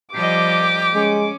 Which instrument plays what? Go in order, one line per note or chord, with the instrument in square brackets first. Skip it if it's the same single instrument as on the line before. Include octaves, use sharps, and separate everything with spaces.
[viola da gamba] F3 G3 D#5 [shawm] G4 [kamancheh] D6
[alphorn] G#3 [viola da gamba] C#4